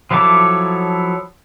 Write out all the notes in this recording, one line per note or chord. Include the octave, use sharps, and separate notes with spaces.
F3 F#3 E4 A4 D6